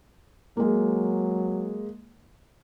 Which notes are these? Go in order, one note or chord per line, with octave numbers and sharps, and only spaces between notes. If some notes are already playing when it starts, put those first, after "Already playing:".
F#3 G#3 A#3